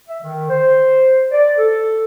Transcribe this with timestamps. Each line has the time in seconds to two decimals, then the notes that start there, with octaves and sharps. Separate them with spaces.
0.08 E5
0.23 D#3
0.50 C5
1.32 D5
1.57 A4